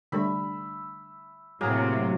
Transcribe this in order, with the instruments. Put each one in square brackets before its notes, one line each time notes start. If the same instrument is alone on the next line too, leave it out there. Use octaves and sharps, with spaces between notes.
[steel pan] D3 G3 A3 [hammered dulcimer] E5 B5
[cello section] A2 C3 [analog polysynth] F#3 [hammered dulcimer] A#3 [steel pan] G#4